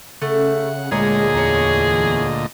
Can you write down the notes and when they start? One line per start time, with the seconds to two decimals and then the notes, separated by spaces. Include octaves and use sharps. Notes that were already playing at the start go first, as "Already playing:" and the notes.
0.22 C#3 A3 F#5
0.91 D2 A#2 G#3 G#4 C#5 D#5 A#5
1.34 E2 C#5 A#5